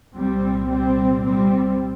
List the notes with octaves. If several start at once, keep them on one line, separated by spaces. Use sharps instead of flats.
C2 A#2 G3 C4
G3 C4
G3 C4